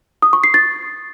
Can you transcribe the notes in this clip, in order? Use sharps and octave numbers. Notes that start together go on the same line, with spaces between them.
D#6
C#6
C7
A6